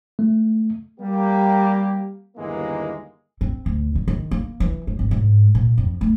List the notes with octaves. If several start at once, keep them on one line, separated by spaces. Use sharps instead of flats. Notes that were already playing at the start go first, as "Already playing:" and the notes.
A3
G3 A#3 G4
G1 D#2 E3 G#3 A#3
C4
D2
D3
D#3
A#3
E3
G#3
G#1
G#2
A#2
F2
A3